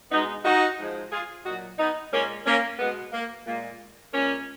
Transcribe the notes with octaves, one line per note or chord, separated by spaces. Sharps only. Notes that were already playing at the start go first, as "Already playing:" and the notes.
B2 G#3 B3 D#4
D#4 F#4
G#2 F3 G#3
F4 G#4
A#2 F#3 D#4 F#4
B3 D#4
A#2 G#3 A#3 C#4
A#3 C#4
B2 G#3 B3
A#3
A#2 G#3 A#3
A#2 G#3 A#3 C#4